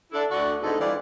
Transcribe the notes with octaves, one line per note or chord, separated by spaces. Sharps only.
D4 E4 A4
D2 D3 F#4 D5
G#2 D3 B3 D#4 E4 A4
E3 G3 C4 F4 D5